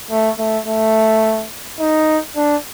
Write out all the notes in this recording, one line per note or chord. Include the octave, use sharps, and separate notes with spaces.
A3
A3
A3
D#4
D4